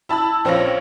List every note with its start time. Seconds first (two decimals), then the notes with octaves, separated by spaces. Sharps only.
0.09 E4 A5 B5 E6
0.45 A#1 C4 C#4 F4 A#6